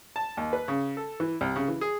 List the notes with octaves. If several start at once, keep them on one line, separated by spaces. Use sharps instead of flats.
A5
D#2
B4
C#3
A4
E3
C2
C#3
E3
G#4